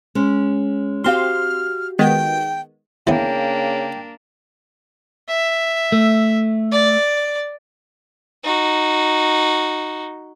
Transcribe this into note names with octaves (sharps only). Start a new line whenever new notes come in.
G#3 C#4
C4 F#4 G4 F5 C6 F6
D#3 G#3 B3 G5
C#3 E3 A#3 B3 D4 G5
E5
A3
D5
D#4 F#4